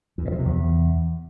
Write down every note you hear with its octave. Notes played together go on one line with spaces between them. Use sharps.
E2
A#2
F3
C3
E2